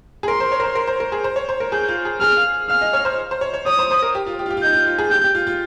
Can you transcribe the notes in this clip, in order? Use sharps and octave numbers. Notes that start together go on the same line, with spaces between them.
G#4
A#4 C6
C5
C#5
A#4
C5
A#4
C5
A#4
G#4
C5
C#5
C5
A#4
G#4 G6
F4
G#4
G#4 F6
F5
F5 F6
D#5
C#5
C5
C5
C#5
C#5
C#5 D#6
C5
C5
A#4
G4
F4
G4
F4
G4
F4
D#4 G6
F4
F4
G#4
G4 G6
G4
F4
F4